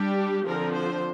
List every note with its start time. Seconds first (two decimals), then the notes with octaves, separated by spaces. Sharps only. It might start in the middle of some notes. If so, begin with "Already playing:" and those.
Already playing: G3 D4 G4
0.45 D3 F3 C4 A#4
0.74 C5